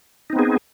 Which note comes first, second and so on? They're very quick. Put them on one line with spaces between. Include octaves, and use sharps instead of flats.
D#4 C4 B3 G#4